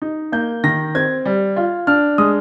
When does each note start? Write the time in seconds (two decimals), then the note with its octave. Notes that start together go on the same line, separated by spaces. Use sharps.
0.02 D#4
0.32 A#3 G6
0.64 D#3 A#6
0.95 C4 G#6
1.25 G3
1.56 F4
1.87 D4 F6
2.18 G#3 D#6